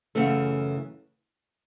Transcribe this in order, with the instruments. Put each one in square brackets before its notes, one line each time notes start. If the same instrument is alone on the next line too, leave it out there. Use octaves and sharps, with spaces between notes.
[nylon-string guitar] F#2 C#3 E3 A3